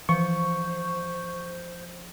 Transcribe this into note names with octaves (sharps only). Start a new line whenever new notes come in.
E3 F3 C5 C#6